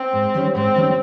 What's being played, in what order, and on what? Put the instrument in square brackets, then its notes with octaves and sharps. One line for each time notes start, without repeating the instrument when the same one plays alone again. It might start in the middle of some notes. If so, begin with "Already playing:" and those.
Already playing: [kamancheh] C4
[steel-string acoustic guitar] G#2
D#3 G3 C#4
[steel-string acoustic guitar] G#2 [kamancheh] C4
[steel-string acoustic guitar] D#3 G3 C#4